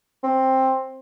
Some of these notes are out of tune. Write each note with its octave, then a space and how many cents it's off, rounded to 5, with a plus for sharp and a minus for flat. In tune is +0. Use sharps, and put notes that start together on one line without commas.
C4 +10